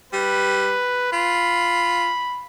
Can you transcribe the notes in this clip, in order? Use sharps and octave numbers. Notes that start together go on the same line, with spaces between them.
G3 B4
F4 B5